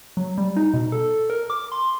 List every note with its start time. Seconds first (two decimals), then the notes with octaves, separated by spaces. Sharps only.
0.17 F#3
0.38 G3
0.57 D#4
0.74 B2
0.92 A4
1.30 A#4
1.50 D6
1.72 C6